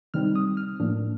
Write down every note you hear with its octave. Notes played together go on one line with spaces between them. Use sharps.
C3 D#3 G3 C4 D#4 F6
D#6
F6
A2 F3 A#3 D4